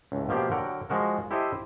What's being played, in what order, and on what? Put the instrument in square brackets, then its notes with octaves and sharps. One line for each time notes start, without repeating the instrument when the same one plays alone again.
[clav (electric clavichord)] C#2 A2
B2 F3 A#3 G4 C5 D5
D3 F#3 A#4 F#5 G5
F3 G#3 F#4 A#4
E4 G4 A4 C5 D#5 E5